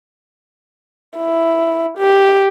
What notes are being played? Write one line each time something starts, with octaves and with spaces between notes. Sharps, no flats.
E4
G4